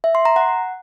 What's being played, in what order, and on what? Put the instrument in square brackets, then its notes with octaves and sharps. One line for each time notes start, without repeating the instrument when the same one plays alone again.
[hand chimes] E5
C6
A#5
F#5